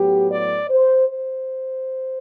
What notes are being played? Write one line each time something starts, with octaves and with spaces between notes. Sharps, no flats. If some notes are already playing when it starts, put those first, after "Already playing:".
Already playing: A2 F#3 B3 G4
D5
C5
C5